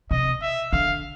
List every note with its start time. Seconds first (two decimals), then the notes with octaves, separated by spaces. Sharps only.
0.11 C3 D#5
0.42 E5
0.72 D3 F5